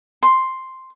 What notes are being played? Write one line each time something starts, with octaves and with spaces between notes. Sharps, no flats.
C6